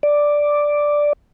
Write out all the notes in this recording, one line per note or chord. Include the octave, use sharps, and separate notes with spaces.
D5